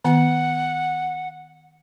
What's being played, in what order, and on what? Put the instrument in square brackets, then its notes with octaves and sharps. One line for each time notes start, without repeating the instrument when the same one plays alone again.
[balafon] D#3 B3 [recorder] F#5